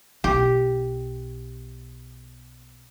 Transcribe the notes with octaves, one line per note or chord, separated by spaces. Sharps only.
B1 E4 G4